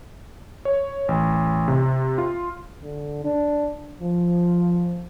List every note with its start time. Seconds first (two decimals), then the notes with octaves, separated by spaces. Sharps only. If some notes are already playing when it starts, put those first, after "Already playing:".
0.65 C#5
1.08 A1
1.68 C3
2.18 F4
2.82 D3
3.24 D4
4.01 F3